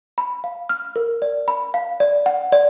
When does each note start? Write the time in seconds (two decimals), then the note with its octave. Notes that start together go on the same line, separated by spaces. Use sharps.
0.18 B5
0.44 F5
0.69 F6
0.96 A#4
1.22 D5
1.48 B5
1.74 F5
2.00 D5
2.26 F#5
2.52 D5